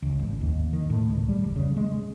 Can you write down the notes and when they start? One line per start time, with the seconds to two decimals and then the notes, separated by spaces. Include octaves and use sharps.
0.02 C#2
0.19 G#1
0.41 D#2
0.73 D#3
0.90 A2
1.10 C#2
1.29 G3
1.44 F1
1.56 C#3
1.76 G#3